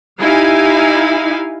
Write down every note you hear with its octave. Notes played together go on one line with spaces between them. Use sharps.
D#4 E4 G4 F5 G#5